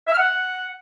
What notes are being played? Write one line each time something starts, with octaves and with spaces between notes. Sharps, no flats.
E5
F6
F#5